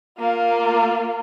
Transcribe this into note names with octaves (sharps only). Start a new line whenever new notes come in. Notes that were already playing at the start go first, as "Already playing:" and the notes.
A#3 F4